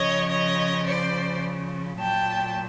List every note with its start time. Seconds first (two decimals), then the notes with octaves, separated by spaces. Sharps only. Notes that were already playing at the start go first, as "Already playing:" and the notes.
Already playing: C#3 F3 C#5 D#5
0.31 C#5 D#5
0.87 C5 D5
2.00 A#2 F#3 G5 A5